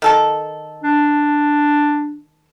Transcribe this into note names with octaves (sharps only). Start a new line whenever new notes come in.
D#3 A4 A5
D4